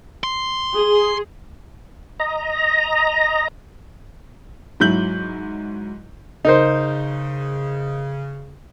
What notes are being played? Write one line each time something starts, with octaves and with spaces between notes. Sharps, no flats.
C6
G#4
D#5 A#5
G#2 F#3 E4 G6 F#7
C#3 D#4 A#4 C5